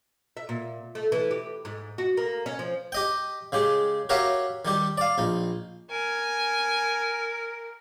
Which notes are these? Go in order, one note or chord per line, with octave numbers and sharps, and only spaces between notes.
E5
A#2
A3
E3
G4
G#2
F#4
A#3
C#4
F3
G4 D#5 G5
C#3 G#3 G4
F#4 G4 A#4 C#5 E5 F5
D#3 G3 G4
D5 F5
A#1 D#4
A#4 G#5